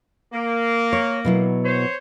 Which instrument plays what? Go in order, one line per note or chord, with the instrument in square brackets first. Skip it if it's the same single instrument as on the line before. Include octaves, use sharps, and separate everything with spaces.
[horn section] A#3
[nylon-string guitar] C#5
B2 F#3 E4
[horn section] C5 C#5